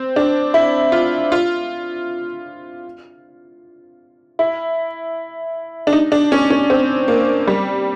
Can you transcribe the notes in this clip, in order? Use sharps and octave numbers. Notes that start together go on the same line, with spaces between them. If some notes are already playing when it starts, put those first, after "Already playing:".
Already playing: C4
D4
E4
F4
F4
E4
D4
D#4
D4
C#4
C#4
C4
A#3
G3